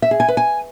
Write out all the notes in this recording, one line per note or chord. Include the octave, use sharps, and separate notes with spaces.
E5
G#4
G#5
B4
G#5